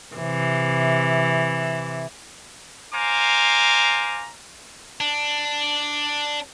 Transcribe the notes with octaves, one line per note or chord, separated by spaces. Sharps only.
C3 E3
C5 F5 G#5 A#5 D6
D4